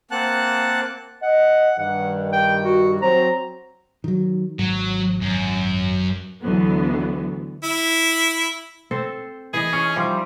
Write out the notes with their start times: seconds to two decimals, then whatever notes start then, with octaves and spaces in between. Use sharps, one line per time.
0.11 A#3 C4 F#5 A5 F#6
1.22 D#5 F#5
1.79 G2 D#3 F#5
2.33 G5
2.64 F#4
3.02 F#3 C4 C5 A#5
4.04 D#3 F#3
4.59 G#1 F#3
5.21 F#2
6.42 D2 D3 E3 F#3 B3
7.63 E4
8.91 C4 A4 C5
9.53 E3 G#4 D#5
9.73 C#4 D#4 C#5
9.96 F3 G3 E5 C6